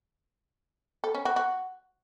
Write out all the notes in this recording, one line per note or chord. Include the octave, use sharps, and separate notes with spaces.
A4
C#4
F#4
F#4